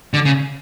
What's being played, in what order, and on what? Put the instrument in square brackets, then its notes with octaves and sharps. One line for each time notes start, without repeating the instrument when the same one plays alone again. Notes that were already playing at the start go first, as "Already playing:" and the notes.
[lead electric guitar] D3
C#3